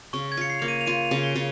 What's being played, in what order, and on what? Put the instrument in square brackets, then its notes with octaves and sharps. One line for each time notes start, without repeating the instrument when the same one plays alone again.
[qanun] C#3 [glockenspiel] C#6
[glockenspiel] G#6
[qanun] F4 [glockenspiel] C#7
[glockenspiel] C7
[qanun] A#3 [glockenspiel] F7
[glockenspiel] D#7
F7
[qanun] F4 [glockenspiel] D#7
[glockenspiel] F7
[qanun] C#3
[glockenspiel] G7
[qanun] C#3